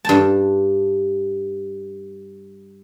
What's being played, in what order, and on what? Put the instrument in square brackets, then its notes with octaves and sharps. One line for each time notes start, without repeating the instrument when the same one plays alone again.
[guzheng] G2 A5